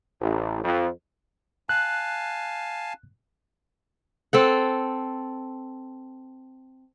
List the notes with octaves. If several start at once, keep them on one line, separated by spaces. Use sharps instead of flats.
A1
F2
F5 G#5 A5 F#6
C4 A4 F#5